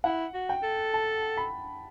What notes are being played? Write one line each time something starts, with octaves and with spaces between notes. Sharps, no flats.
E4 F#5
F#4
G5
A4
A5
B5